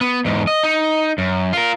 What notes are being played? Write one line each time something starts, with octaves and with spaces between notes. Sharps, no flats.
B3
E2 G#2
D#5
D#4
F#2
F4 A#4